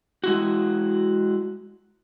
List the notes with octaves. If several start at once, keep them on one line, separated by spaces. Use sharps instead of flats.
G#3 E4 F#4